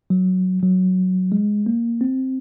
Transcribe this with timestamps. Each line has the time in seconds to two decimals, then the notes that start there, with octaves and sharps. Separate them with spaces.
0.10 F#3
0.62 F#3
1.32 G#3
1.66 A#3
2.01 C4